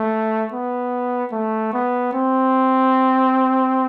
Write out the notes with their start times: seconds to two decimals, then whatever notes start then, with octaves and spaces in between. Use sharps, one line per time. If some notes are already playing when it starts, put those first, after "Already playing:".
Already playing: A3
0.53 B3
1.32 A3
1.73 B3
2.13 C4